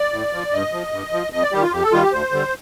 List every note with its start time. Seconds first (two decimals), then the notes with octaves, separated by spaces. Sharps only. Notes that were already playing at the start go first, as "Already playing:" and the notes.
Already playing: D5
0.13 A2
0.33 F3
0.53 G2 D#5
0.73 F3
0.92 G2
1.13 F3
1.33 F2 D#5
1.43 D5
1.52 D#3 G3 G4
1.62 F4
1.72 F2 G4
1.82 A4
1.92 D#3 G3 F4
2.02 G4
2.12 D2 C5
2.32 D3 G3